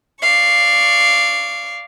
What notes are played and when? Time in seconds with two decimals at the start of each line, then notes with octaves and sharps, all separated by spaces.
0.20 D5 F5 C#6